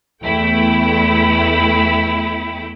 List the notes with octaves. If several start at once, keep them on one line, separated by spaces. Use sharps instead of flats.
E2 A3 E4 G5